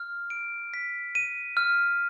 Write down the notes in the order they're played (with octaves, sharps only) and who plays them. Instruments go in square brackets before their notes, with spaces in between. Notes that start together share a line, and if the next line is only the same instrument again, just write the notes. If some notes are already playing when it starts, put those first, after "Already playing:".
Already playing: [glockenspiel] F6
D7
B6
D#7
F6